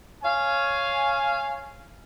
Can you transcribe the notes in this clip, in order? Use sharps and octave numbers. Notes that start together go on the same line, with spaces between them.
C#5 F5 G#5